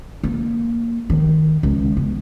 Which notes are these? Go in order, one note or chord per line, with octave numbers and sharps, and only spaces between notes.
A#3
D#3
C#2
B3